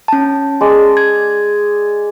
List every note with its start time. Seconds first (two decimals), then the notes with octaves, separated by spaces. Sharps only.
0.08 C#4 A5
0.61 G#3 D5
0.97 G#6